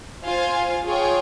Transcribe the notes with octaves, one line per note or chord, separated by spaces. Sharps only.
F4 C5 F5 G#5
F4 G#4 C#5 G5